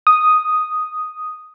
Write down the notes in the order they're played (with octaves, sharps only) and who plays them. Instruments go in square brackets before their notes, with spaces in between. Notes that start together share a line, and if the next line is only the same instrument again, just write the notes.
[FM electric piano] D#6